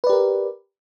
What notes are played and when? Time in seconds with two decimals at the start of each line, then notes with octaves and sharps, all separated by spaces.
0.04 B4
0.07 D5
0.10 G4
0.13 A#4